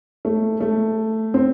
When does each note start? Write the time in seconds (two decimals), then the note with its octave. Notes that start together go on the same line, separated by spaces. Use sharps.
0.25 A3
0.60 A3
1.34 C4